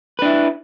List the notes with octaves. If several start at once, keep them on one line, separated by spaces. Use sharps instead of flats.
D4 E4 B4